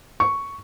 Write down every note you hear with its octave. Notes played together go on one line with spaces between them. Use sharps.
C#6